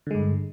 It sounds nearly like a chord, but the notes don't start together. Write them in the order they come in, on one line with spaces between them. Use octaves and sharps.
D3 G#3 G2